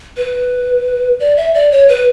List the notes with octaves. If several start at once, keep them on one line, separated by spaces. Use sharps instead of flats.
B4
D5
E5
D5
C#5
B4